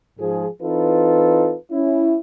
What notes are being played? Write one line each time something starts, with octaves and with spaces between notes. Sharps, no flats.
G#2 F3 G#4
E3 C4 D#4 F4 A4 B4
C#4 E4